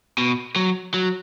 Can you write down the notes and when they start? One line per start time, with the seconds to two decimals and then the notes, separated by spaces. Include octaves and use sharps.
0.18 B2
0.56 F#3
0.94 F#3